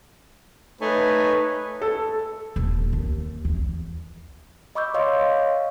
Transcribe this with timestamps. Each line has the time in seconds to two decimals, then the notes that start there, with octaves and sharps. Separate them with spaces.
0.81 A3 D#4 B4 C#5 G#5
1.82 A4
2.56 D#1
2.93 D#2
3.45 E2
4.75 D#5 B5 C#6 D6 E6 G6
4.94 C#5 D#5 F5 C6 C#6